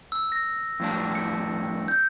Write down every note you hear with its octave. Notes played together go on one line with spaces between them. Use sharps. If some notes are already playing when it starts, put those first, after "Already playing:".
E6
A#6
F2 A2 D4
C#7
G6